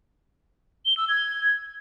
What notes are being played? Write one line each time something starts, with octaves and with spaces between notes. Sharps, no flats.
G7
E6
G#6